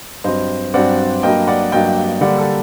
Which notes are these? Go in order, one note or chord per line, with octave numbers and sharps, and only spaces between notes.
G2 F#3 C4 C5 D#5
G2 F#3 C4 D5 F#5
G2 F#3 A#3 D#5 G5
D5 F#5
G2 F#3 A#3 D#5 G5
D3 G3 A#3 D4 D5 F#5
A4